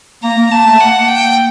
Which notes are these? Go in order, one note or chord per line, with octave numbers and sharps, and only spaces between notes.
A#3 A#5
A#3
A#3 A5
A3
A#3 F#5
G5